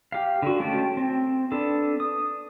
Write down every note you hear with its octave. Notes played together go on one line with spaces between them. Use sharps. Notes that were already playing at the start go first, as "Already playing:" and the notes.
G4 F5
D3 F#4
G#3 A3 C#4 G5 A5
C4
B3 D4 A4
D#6